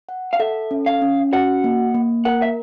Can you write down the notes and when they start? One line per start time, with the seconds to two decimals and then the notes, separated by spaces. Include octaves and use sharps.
0.09 F#5
0.33 F5
0.39 A4 E5
0.71 C#4
0.86 F5
1.02 C#4
1.32 F#4 F#5
1.64 A#3
1.94 A#3
2.25 A#4 F#5
2.42 E5